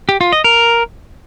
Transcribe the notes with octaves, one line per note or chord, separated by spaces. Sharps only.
G4
F4
D#5
A#4